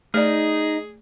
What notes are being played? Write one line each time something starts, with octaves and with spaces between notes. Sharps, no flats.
A3 D#4 G#4 D5